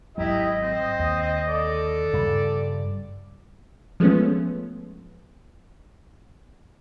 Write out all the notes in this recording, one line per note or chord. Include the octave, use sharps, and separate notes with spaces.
G#1 C#2 F#3 E4 G4 D#5
C4
D#2
A4 D5
G2 C#3 G3
F3 G#3 A3 B3 C#4